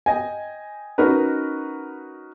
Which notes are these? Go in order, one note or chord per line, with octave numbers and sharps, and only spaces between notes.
D#5 G5 G#5
C#4 D#4 F#4 A#4 B4